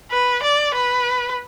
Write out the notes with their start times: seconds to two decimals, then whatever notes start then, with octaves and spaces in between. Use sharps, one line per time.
0.11 B4
0.43 D5
0.74 B4